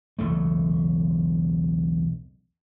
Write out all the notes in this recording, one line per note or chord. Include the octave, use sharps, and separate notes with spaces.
E1 B1 C#3 A3